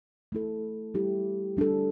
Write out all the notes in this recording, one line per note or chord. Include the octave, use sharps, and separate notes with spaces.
A3 E4 A4
G3 E4 G4
G3 D4 A4